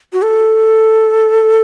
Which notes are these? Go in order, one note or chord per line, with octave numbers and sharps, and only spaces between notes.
F#4
A4